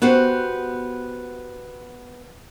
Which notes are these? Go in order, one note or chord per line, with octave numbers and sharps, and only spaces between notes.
B3 F#4 G4 C5